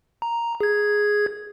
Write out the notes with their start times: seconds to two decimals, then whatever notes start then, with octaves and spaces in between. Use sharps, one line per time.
0.22 A#5
0.61 G#4 G#6